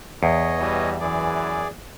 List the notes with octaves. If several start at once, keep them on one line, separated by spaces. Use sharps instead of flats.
E2 C#5 D#5
B2 E3 G3
F#2 E3 G#4 D5